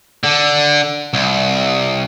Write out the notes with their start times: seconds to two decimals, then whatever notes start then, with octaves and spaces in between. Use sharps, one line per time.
0.24 D3
1.14 C2